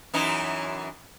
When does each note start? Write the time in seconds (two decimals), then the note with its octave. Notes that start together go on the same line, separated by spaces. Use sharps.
0.14 F#2 E3 D#4